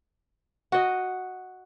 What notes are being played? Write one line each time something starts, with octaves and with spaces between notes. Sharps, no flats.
F#4 D#5